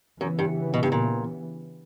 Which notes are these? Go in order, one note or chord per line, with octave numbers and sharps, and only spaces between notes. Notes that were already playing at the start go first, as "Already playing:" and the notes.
F#2 C#3 E3 B3
G2
B2
G2
A#2